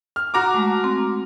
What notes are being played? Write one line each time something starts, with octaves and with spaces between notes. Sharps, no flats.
F6
F#4 A#5 D6
G#3 A3
C4